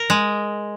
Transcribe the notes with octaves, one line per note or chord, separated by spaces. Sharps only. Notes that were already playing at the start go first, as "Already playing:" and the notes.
Already playing: A#4
G#3